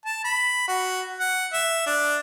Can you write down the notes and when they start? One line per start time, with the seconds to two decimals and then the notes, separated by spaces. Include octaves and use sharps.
0.06 A5
0.24 B5
0.68 F#4
1.20 F#5
1.53 E5
1.87 D4